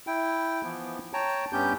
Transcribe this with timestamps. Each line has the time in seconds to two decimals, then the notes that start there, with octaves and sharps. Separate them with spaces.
0.07 E4 G5
0.63 E3 F3 B3
1.13 C#5 G5 A5 A#5
1.53 G2 B3 C#4 G4 G6